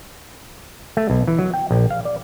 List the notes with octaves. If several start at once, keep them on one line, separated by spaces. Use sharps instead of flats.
A3
B1
E3
F#3
G5
A#1
F5
D5